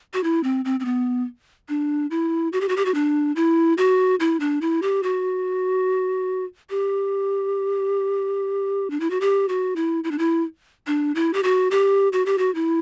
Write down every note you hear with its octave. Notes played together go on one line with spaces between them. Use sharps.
F#4
E4
C4
C4
C4
B3
D4
E4
F#4
G4
F#4
G4
F#4
D4
E4
F#4
E4
D4
E4
G4
F#4
G4
D4
E4
F#4
G4
F#4
E4
E4
D4
E4
D4
E4
G4
F#4
G4
F#4
G4
F#4
E4